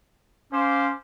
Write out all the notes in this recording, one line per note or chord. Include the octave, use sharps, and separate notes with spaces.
C#4 C5 F5 D6